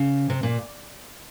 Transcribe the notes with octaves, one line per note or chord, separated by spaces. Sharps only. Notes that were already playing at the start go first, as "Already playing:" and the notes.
Already playing: C#3
C3
A#2